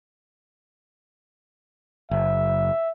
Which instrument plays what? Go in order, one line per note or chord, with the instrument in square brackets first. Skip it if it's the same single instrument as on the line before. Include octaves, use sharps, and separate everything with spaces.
[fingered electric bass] F#1 [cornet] E5